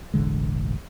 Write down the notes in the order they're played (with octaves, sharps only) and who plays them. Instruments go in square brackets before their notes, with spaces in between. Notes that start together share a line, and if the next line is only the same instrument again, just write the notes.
[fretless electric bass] E1 A1 D3 G#3